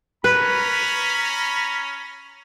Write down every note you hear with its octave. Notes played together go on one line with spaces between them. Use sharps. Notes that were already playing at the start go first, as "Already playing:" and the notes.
C#4 B4 A#5 B5